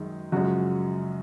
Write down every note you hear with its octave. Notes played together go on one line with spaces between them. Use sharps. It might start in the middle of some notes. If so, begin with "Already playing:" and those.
Already playing: F#2 D#3 G#3
F#2 C#3 F3 G#3 F#4